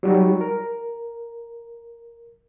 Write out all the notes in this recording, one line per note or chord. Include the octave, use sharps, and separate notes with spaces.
F#3 G3 D#4 F#4
A#4